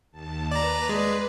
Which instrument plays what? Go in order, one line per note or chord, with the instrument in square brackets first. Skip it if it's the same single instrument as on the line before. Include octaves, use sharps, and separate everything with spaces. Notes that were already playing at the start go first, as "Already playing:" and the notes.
[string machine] D#2 A5
[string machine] B4 [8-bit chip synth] D5 A#5
[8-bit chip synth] G#3